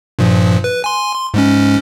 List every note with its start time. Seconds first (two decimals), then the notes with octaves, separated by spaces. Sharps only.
0.19 G2 A#2 F3
0.64 B4
0.84 G#5 C6
1.15 C6
1.34 G#2 G#3 C#4